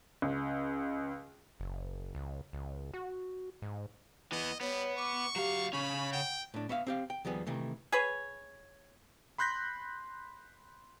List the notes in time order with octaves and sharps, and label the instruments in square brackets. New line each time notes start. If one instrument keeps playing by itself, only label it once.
[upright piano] C#2
[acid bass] F#1
C#2
C#2
F#4
G#2
[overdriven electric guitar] E3 B3 [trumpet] D#5
[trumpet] G3 [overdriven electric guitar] B3 [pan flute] C#5
[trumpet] C#6 [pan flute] D6
[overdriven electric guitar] F#3 F5 [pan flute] G4
[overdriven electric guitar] C#3 C#4 [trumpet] B5 [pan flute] C#6
[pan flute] F#5 [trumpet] G5
[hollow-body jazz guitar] A2 D4
B3 C#5 E5 F5
C4 G4 F5
G5
D#2 F3 G3 B3 G#4
C3 D#3 E3 A3
[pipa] G#4 B4 C#5
[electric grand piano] B5 C6 F#6 G6 A#6 B6